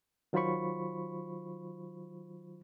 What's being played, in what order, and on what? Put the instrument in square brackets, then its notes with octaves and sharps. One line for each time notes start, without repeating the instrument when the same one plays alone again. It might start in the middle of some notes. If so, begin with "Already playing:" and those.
[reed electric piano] D#3 F#3 F4 C5 B5 C#6